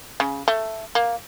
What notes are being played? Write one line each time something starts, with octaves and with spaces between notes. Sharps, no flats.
C#3
A3
A#3